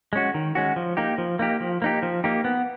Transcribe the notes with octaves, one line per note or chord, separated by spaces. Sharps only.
G#3 C#4 F#4
D#3
G#3 C#4 F#4
F3
A#3 D#4 G4
F3
A#3 D#4 G4
F3
A#3 D#4 G4
F3
A#3 D#4 G4
B3